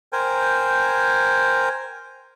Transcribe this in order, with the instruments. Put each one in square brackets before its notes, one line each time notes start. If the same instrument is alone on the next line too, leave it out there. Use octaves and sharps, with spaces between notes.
[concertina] A#4 C5 G5 G#5